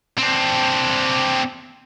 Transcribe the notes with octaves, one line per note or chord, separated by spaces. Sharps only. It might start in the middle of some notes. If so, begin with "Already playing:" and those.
C4 D4